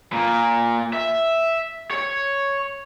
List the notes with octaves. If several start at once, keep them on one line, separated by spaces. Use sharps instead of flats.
A#2
E5
C#5